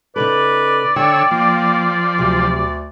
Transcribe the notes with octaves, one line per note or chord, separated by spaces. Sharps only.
C#3 D#4 A4 B4 D5
D3 C#5 G5 E6
F3 A#3
D2 C3 F#3